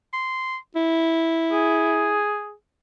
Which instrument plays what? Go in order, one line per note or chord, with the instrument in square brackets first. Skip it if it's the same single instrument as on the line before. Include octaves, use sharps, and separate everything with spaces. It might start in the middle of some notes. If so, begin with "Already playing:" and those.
[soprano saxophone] C6
E4
[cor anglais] G#4